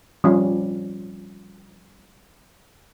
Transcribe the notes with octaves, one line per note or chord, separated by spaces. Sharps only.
F3 G3 C#4